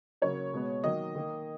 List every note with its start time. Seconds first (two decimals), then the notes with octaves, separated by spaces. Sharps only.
0.22 C#3 F#3 A#3 C#5
0.53 B2 G#3 B3
0.84 D#3 F#3 A#3 D#5
1.15 D#3 A#3